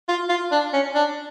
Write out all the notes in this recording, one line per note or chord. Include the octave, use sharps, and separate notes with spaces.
F4
F4
D4
C#4
D4